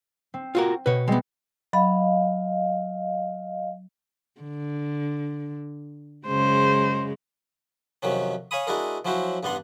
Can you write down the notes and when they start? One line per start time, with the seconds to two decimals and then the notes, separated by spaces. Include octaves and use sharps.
0.34 C4
0.55 F4 F#4 A#4
0.86 B2 B4 C#5
1.08 G3 G#3 B3 C4 D#5
1.73 F#3 D#5 F5 B5
4.41 D3
6.27 F#2 C#3 G#3 C5
8.03 F2 C3 D#3 F#3 C#4
8.51 C#5 F5 G#5 B5 D#6
8.67 G#3 D4 E4 F#4 G#4 A#4
9.05 F3 F#3 C#4 E4 F#4 C5
9.43 A1 G2 B3 D4 F#5 C6